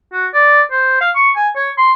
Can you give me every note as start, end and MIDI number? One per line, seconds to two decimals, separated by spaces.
0.13 0.27 66
0.34 0.62 74
0.71 0.97 72
1.01 1.10 77
1.16 1.30 85
1.36 1.49 80
1.56 1.71 73
1.78 1.93 84